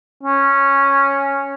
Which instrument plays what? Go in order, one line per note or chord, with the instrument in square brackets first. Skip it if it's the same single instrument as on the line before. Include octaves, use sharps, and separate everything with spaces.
[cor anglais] C#4